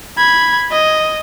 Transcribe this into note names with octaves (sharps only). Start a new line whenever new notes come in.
B5 G#6
D#5